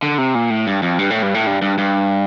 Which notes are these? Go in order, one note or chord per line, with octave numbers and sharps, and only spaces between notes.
D3
C3
A#2
A2
G2
F2
G2
A2
G2
A2
G2
G2
G2